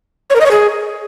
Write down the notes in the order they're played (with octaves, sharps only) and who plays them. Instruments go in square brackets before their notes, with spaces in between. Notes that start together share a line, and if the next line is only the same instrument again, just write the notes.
[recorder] C#5
A#4
D#5
C#5
G#4